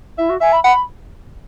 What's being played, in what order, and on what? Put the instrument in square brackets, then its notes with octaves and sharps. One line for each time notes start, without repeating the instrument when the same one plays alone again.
[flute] E4 [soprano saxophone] E5
[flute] F#4
[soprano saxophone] E5 [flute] G#5
[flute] B5
[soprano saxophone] F#5 [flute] B5